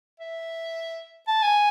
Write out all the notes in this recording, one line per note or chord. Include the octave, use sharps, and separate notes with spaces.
E5
A5
G#5